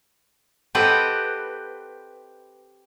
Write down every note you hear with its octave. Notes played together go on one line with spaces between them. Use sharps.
C4 G4 A4 B4 D#5 F#5